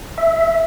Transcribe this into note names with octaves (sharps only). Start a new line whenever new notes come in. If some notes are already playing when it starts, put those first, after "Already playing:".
E5